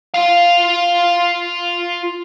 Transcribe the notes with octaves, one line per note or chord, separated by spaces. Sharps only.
F4 F5